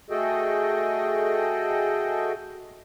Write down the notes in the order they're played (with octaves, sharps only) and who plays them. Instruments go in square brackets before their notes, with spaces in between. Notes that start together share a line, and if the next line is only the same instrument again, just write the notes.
[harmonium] A3 F#4 G#4 A4 D#5 G5